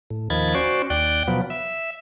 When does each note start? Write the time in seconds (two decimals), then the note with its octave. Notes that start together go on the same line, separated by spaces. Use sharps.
0.10 A2
0.30 D#2 D#3 F3 B5 G#6 A6
0.55 C#4 F#4 C5 D5
0.90 D#2 D5 G5 F#6
1.28 B2 F3 F#3 B3
1.50 E5